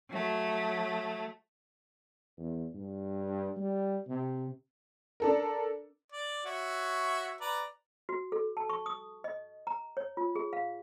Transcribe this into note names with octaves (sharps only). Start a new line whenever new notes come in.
F#3 A3
E2
G2
G3
C3
D4 A4 A#4
D5
F#4 C#5 E5
B4 D5 A#5
F#4
A4
A5
C#6
D#6
D#5
A#5
C#5
F4
G#4
F5